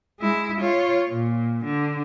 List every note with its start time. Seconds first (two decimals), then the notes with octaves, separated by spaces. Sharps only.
0.20 G#3 E4
0.61 F4 C#5
1.10 A#2
1.64 D3